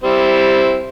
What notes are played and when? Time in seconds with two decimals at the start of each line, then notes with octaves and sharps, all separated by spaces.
0.04 G3 C4 E4